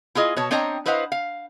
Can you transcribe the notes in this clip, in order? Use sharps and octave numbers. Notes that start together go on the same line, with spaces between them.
E4 F4 G#4 D#5
B2 C#5 A5
C4 D4 C#5 D#5 G5 A#5
E4 B4 C5 D#5 F5 F#5
F5